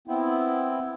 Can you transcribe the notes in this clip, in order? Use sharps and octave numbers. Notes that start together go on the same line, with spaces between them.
B3 C4 E4